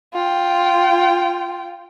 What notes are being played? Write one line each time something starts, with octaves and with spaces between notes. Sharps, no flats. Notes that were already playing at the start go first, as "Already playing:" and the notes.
F4 G5